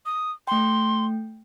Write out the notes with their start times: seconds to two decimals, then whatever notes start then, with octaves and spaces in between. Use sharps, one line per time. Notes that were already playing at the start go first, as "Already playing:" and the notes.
0.06 D#6
0.47 A3 G5 C6